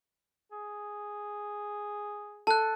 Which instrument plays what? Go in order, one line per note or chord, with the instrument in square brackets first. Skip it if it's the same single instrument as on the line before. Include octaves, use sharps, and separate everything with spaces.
[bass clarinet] G#4
[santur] A4 [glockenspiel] A5 F#6